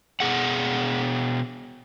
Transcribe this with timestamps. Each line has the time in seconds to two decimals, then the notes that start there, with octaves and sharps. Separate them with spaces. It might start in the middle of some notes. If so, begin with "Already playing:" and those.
0.20 B2 G#4 F#5